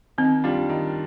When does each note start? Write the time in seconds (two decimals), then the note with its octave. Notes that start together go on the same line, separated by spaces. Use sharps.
0.18 D#3 C4
0.44 G3 D4 F4
0.69 D#3